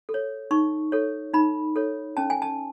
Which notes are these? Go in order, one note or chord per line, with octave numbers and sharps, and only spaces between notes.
A4
C#5
D#4 C#6
A4 C#5
D#4 B5
A4 C#5
C#4 A5
G#5
A5